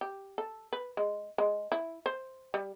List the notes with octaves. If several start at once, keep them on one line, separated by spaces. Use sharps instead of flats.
G4
A4
B4
G#3
G#3
E4
C5
G3